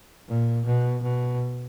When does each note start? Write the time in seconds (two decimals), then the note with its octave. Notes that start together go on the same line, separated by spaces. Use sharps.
0.28 A#2
0.66 B2
1.03 B2